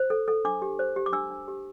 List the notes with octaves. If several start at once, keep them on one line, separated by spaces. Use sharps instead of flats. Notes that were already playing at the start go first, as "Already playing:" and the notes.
Already playing: C5
A4
A4
D4 D6
G4
C5
G4
D6
D4 E6
D4
G4